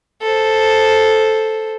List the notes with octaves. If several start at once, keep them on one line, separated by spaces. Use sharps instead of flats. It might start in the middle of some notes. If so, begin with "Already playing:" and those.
A4 C5